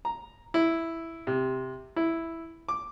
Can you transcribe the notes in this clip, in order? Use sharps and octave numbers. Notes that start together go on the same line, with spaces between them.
A#5
E4
C3
E4
D6